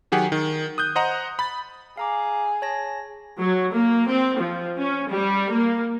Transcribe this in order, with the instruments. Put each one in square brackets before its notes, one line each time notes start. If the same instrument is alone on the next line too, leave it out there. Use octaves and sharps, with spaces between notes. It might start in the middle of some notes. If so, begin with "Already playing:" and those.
[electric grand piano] D#3 F#3 G4 G#4 F#5
D#3
D#6 F#6 G6
C5 D#5 F#5 A#5
B5 A6
[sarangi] G#4 [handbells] F5 A#5 D6
[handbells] C#5 A5 A#6
[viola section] F#3
A#3
C4
F3
C#4
G3
A#3